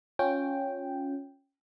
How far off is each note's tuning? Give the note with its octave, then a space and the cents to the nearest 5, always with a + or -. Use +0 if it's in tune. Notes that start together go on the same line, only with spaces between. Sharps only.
C#4 +0 F4 +25 G5 +0